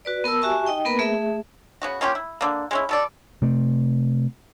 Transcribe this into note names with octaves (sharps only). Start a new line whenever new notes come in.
F#4 B4 D5
B3 A#4 A5 E6
F#4 G4 E5 G#5 A5 C#6
D#4 D#5 G5
A#3 B3 A#4 B4 B5
A3 G#4 E5
C#3 B3 F#4
A#3 C#4 F4 G4
E4
D3 A#3
G#3 C#4 E4
B2 A4 D5
C3 A3 C4